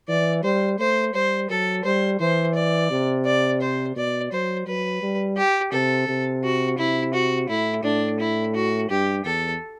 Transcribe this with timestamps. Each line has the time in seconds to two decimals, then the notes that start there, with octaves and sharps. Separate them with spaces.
0.09 E3 D5
0.43 G3 C5
0.79 A3 C5
1.14 G3 C5
1.50 F#3 A4
1.85 G3 C5
2.20 E3 C5
2.55 D5
2.91 C3
3.26 D5
3.61 C5
3.96 B2 D5
4.32 F#3 C5
4.67 F#3 B4
5.02 G3
5.37 G4
5.72 C3 A4
6.08 C3
6.44 F#4
6.78 C3 E4
7.14 F#4
7.49 A2 E4
7.84 A2 D4
8.20 E4
8.55 F#4
8.90 G2 G4
9.25 E2 A4